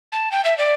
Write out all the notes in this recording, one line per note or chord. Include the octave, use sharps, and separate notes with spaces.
A5
G5
E5
D5